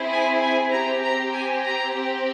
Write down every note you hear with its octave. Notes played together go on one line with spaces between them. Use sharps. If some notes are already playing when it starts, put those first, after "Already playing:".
Already playing: C4 E4 G#4
G#5
G#5
C4 G4 A#5
A#5
G#5
A#5
C4 G4